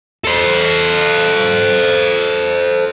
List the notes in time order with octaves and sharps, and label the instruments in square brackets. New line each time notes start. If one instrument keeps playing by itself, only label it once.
[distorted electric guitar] A4 C5